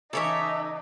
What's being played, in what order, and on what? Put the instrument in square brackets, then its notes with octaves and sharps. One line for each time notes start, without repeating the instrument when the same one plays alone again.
[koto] C#3 E3 C#4 [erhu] D#4 [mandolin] A4 C#5 E5 [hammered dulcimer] D6